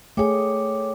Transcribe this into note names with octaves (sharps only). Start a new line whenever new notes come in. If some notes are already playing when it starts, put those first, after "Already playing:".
A3 G#4 C#5 G5 D6